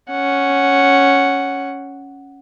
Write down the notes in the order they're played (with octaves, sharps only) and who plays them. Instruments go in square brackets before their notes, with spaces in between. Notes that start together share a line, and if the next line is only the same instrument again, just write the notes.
[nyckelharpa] C#4 F#5